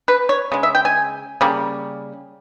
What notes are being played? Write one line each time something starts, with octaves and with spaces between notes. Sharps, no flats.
B4
C#5
C#3 G#3
E5
G5
G#5
C#3 G3 A#3